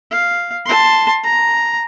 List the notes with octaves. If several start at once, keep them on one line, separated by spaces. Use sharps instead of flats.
F5
A5 C6
A#5